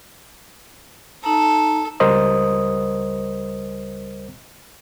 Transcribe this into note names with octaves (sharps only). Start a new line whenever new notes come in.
D#4 A4 A#5
C#2 G3 A#4 C5 D#5 D#6